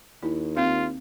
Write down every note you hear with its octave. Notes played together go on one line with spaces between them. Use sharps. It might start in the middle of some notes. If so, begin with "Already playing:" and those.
D#2 E4
C4 F4 F5